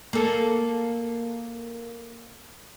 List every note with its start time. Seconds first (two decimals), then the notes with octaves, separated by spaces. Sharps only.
0.13 A#3 A4